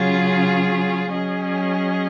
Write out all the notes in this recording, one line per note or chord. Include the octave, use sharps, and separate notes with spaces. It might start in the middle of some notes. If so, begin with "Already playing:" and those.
Already playing: C#3 F#3 C#4 F4 G#4
F#3 C#4 G#4 D#5